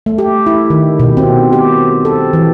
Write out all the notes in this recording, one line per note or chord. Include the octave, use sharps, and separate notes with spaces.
A3
G4
E4
D#3
B2
C4
G4
A4
E3